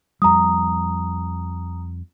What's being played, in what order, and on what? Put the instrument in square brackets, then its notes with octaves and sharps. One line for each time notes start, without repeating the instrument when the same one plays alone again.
[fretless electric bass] F2 G3 [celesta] A#5 D#6